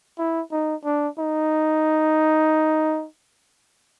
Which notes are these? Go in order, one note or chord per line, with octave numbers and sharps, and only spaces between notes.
E4
D#4
D4
D#4